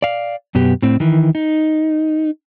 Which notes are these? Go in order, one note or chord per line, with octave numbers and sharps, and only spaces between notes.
D5 F5
F#2 B2 B3 G4
A2 C4
D#3 E3
D#4